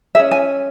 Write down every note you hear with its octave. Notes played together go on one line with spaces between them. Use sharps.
C#4 G#4 E5
G#5